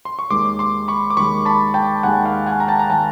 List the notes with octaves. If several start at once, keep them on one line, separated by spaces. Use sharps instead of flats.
C6
C#6
D#2 D#3 G#3 C6 D6
C6 D6
B5 C#6
D6
D#2 D#3 G#3 B5 C#6
A5 B5
G5 A5
D#2 D#3 G#3 F#5 G#5
F5 G5
F#5 G#5
A#5
G5 A5
A#5
D#3 G#3 G5 A5